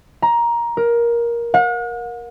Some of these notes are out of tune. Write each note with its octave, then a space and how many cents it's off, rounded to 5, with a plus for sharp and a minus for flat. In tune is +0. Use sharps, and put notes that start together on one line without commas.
A#5 +15
A#4 +15
F#5 -45